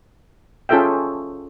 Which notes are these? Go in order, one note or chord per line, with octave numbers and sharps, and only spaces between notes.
C#4 F4 G#4 A4 E5 G5